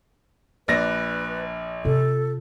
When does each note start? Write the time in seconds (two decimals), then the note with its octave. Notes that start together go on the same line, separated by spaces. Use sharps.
0.68 A#1 D4 B4 A#6
1.85 C3 F4 A4